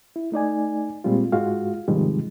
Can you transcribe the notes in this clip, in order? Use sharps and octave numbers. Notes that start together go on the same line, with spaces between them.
E4
A3 D#4 D5 G#5
A#2 G3 G#3 C4 F4
G#2 G#3 F4 F#4 F5
G#2 C3 D#3 F3 G3 G#3